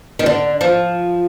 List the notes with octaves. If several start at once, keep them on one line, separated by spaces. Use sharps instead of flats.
D#3
D3
F3